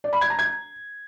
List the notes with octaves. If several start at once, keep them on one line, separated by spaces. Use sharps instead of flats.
D5
B5
G#6
A#5
G#6